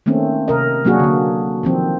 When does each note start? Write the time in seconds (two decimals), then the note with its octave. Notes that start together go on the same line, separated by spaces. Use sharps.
0.06 D#3 A3 A#3 C4 C#4
0.48 C3 A#4 D#5
0.85 F#3 A#3 D4 F#4 G#4
0.99 D3 A#3
1.63 D#3 F3 C4